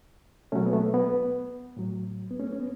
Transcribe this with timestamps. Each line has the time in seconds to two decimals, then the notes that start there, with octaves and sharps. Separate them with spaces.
0.52 B2 F#3 A3 C#4
0.66 B3
0.73 A3
0.94 B3
1.77 A2 F#3
2.31 B3
2.39 A3 C#4
2.52 C#4
2.60 B3